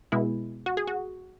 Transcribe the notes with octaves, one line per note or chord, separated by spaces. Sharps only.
B2 G#3 E4
F#4
G#4
F#4